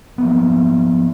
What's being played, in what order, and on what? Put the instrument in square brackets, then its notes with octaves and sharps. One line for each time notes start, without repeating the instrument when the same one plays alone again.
[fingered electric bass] F3 A#3 B3